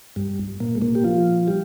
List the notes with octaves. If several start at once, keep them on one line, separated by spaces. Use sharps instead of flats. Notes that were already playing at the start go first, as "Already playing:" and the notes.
G2 G3
A#2 A#3
G#3
A#2 A#3
G4
F3 F4
G3 G4